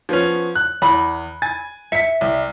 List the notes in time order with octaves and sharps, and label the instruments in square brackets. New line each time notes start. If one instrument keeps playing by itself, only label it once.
[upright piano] F3 B3 C#4
F#6
[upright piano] E2 [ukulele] B5
[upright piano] G#5 A6
[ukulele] E5 [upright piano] B6 C#7
[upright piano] C2